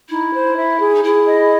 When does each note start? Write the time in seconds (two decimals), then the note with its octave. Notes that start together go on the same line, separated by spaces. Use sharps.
0.09 D#4 E4
0.33 C5
0.56 E5
0.80 G#4
0.94 D#4
1.03 E4 G#4
1.26 D#5